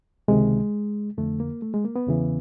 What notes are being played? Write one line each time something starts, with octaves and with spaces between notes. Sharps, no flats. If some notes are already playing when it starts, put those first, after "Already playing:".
C#2 C3 D#3 G#3
F2 D3 A3
A#3
A3
G#3
A#3
B3
E2 C#3 E3